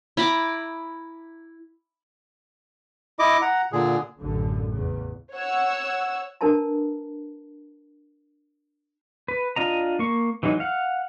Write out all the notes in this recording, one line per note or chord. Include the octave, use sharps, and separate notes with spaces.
E4 A#5 B5 D6
E4 D#5 D6
F#5 A#5
A#2 D3 G#4
A1 F#2 D3
E2 C#3
C#5 F#5 E6
D4 A#4 B4 A5 A#5
B4
D4 F4 D#5 A#5
A#3 C#6
E3 F#3 G#3 D#4
F5 F#5